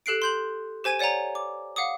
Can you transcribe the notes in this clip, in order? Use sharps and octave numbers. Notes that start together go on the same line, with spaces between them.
G4 A4 F#6 C7 D7
C6 G6 F#7
G4 C5 G#5 G#6 D#7
C#5 D5 F#5 G#5 A#5
D6
F5 F#5 D6 D#6